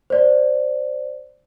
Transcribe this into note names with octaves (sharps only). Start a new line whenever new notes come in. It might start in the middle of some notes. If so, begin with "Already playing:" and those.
C5 D5